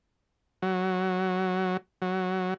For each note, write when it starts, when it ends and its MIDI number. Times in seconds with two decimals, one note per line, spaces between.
0.62 1.77 54
2.02 2.54 54